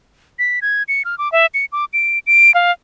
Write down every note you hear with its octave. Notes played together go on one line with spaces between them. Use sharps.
B6
G#6
C#7
F6
D6
E5
C#7
D6
D7
D7
F5